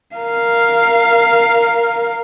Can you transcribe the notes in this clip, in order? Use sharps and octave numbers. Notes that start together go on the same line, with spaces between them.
A#4 F5